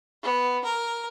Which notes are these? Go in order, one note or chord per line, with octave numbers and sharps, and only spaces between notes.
B3
A#4